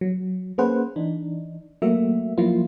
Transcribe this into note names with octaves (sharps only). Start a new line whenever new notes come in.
F#3
A#3 C#4 G#4 B4 C5 F#5
E3 D4 D#4
F#3 A3 A#3 F#4 E5
F3 F#3 A#3 E4 F4